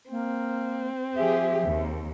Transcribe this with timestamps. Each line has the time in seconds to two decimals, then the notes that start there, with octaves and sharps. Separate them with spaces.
0.10 A#3 C4
1.16 F3 G4 G#4 E5
1.65 D#2